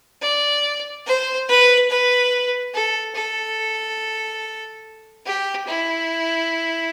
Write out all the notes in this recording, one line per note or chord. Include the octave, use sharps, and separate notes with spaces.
D5
C5
B4
B4
A4
A4
G4
E4